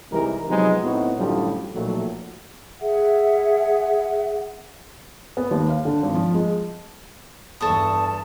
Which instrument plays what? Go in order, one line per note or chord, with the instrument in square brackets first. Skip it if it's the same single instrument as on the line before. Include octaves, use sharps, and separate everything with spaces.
[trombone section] C2 E3 G3 G#3 D#4 A#4
C3 F3 F#3 G#3 B3 D#4
A2 B3 C4 D#4 F#4
F#2 A2 D3 F3 G3
B1 A#2 F3 F#3 A3
[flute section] G#4 E5 F#5
[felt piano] B3
D#2
F5
D3
G#1
F3
G#3
[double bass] E2 G2 [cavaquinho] A4 C#6 D#6 [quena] A5